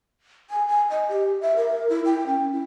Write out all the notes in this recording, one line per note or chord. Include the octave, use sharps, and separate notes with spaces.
G#5
G#5
D#5
G4
E5
A#4
E4
G5
C#4
E4